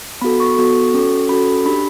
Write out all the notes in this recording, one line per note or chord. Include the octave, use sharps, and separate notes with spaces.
B3 F#4 A4 B5
C#6
B3 F#4 A4
C#4 F#4 A4
C#4 F#4 A4 B5
B5
D4 G4 B5